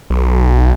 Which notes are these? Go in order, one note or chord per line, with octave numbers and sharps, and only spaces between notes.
B1